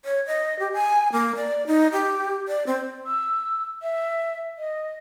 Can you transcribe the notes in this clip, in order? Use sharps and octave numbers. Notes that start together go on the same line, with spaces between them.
C#5
D#5
G4
G#5
A#3
D5
D#4
G4
D5
C4
E6
E5
D#5